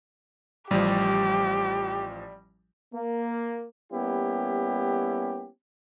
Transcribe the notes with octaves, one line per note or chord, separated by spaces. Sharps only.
A1 F3 G3 G4
A#3
G3 A#3 B3 C#4 E4 G4